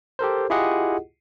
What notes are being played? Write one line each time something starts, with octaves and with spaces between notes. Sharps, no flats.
G4 A4 A#4 C5
E4 F4 G4 G#4 D#5 F#5